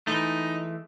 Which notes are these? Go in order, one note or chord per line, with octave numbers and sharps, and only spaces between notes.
E3 G#3 A3 D#4